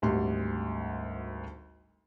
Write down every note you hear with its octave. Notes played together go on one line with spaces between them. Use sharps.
G#1 D2 G3 C6